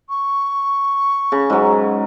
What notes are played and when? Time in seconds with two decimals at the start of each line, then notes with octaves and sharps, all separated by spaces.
0.09 C#6
1.32 C#3
1.50 G#2 F#3